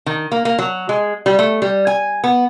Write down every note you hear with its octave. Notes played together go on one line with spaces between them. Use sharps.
D#3
A#3
A#3
F#3
G#3
G3
A3
G3
G#5
B3